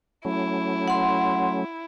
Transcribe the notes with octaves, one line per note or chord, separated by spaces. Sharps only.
F#3 A3 C#4 E4
F#5 C6